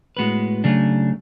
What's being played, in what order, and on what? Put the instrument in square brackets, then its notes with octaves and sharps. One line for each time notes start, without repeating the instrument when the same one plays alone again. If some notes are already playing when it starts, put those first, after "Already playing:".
[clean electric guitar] A2 G#3 B3 F#4 B4
C#3 F#3 A3 D4